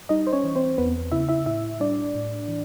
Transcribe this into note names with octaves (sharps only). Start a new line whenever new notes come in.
G3 D#4 D#5
C5
C#4 C#5
E3
C4 C5
E2 B3 B4
C#3 E4 E5
E4 E5
A2 E4 E5
G3 D4 D5
A2
E3